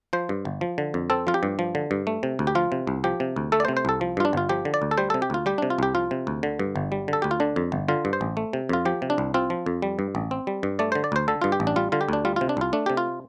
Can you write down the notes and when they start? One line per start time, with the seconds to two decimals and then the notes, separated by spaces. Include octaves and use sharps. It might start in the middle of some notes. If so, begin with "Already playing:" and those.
0.13 F3 C5
0.29 G2
0.45 G1
0.61 F3
0.78 D3
0.94 F2
1.10 C4 A4
1.27 F3 F4
1.34 G4
1.43 G2
1.59 F3
1.75 D3
1.91 G2
2.07 A3
2.23 C3
2.39 D2
2.47 G4
2.55 F3 F4
2.72 C3
2.87 C2
3.04 F3 G4
3.20 C3
3.36 D2
3.52 A3 A4
3.60 D5
3.65 C5
3.68 C3
3.77 C5
3.85 C2 A4
4.01 F3
4.17 G2 F4
4.25 D4
4.33 G1 F4
4.49 F3 G4
4.65 D3
4.74 D5
4.82 D2
4.91 A4
4.98 G3 C5
5.10 C3 A4
5.22 G4
5.30 D2 F4
5.46 G3 G4
5.58 C3 D4
5.70 F4
5.79 C2 G4
5.95 F3 F4
6.11 C3
6.27 D2
6.43 D3
6.59 G2
6.76 G1
6.92 G3
7.08 D3 A4
7.22 D2 G4
7.31 F4
7.40 D3 D4
7.56 F2
7.72 G1
7.88 D3 F4
8.05 G2
8.13 C5
8.21 A1
8.37 A3
8.53 C3
8.69 F2 F4
8.85 F3 G4
9.02 C3
9.10 D4
9.18 C2
9.34 C4 F4
9.50 F3
9.66 F2
9.82 G3
9.99 G2
10.15 A1
10.31 C4
10.47 G3
10.63 G2
10.79 A3 D5
10.92 D3 C5
11.04 D5
11.12 D2 C5
11.28 D3 A4
11.42 G2 F4
11.52 G4
11.60 A1
11.67 D4
11.76 G3 F4
11.92 D3 F4
12.01 G4
12.09 D2 D4
12.25 G3 F4
12.36 C3 F4
12.49 D4
12.57 C2 F4
12.73 A3 D4
12.86 C3 G4
12.97 F4